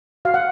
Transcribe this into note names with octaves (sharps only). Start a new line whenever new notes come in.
F#4 F5
F#5